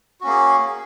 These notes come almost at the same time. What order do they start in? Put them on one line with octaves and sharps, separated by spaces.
F#4 C#4 A#3 G#4